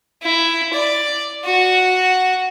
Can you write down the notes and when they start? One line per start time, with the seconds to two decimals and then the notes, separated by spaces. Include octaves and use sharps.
0.23 E4
0.74 D5
1.45 F#4